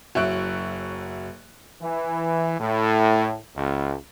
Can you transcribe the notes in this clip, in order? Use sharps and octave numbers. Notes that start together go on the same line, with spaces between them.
F#1 F#3 E5 C#6 F#6 D7
E3
A2
C#2